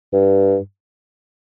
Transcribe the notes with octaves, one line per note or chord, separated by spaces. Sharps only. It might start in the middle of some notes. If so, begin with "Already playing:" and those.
G2